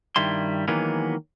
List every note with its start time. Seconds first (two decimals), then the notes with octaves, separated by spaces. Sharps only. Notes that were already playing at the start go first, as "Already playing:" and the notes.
0.16 G2 D#3 G3 E4 C6
0.68 D#3 E3 F#3 G#3 A#3 B3